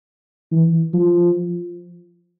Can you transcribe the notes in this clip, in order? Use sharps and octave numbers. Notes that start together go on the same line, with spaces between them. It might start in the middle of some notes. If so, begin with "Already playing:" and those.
E3
F3